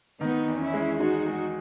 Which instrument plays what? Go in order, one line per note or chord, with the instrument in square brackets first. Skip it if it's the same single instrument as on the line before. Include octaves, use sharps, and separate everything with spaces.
[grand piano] D#3 [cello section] B3 D#4
[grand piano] E2
[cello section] C#4 E4
[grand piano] G#3
[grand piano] G#3 [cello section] D#4 F#4
[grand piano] G#3